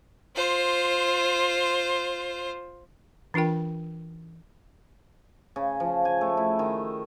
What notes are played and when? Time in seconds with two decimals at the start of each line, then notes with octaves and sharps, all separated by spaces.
0.36 F4 C5
3.34 E3 D4 F4 A#4 G5
5.56 C#3
5.80 F3
6.05 G#5
6.21 A3
6.37 E4
6.59 D#3